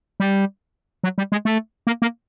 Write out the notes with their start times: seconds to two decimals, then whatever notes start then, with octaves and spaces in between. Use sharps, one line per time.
0.20 G3
1.04 F#3
1.18 G3
1.32 G#3
1.45 A3
1.87 A#3
2.02 A#3